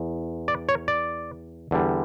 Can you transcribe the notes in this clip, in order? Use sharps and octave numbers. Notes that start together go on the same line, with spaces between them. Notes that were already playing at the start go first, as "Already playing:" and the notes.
Already playing: E2
D5
C#5
D5
E2 D3 G3